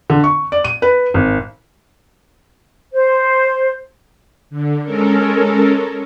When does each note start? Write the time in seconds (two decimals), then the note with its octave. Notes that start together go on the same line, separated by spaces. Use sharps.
0.10 D3
0.24 C#6
0.52 D5
0.64 D#7
0.82 B4
1.14 G#1
2.93 C5
4.50 D3
4.83 G#3 C#4 A4 A#4